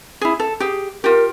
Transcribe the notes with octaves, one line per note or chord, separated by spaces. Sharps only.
E4 G#4
A4
G4 G#4
F4 G4 A#4